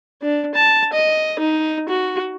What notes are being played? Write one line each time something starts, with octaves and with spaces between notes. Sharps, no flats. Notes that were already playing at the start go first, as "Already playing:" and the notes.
D4
A5
D#5
D#4
F#4